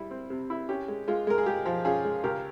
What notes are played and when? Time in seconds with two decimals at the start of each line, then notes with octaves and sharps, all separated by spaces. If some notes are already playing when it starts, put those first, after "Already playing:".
Already playing: G3 E4
0.11 C4
0.30 C3
0.50 E4
0.69 C#4 G4
0.88 G#3
1.08 G#3 F4
1.27 G#3 A#4
1.38 G#4
1.46 G#3 G4
1.66 F3
1.85 C#4 F4 G#4
2.05 G#3
2.24 C#2 G4 A#4